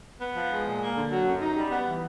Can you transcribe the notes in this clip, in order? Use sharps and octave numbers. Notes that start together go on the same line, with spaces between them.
B3
F3
G#3
A#2
A#3
D3
F#3
F#2
D#4
G3
B3
E3